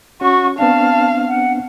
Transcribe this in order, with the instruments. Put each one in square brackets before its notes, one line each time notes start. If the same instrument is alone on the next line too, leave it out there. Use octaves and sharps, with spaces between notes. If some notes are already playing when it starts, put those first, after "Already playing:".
[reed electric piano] C#4 [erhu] F#4 [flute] C#6
[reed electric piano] B3 C4 D4 [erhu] F5 [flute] A5
[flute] F#5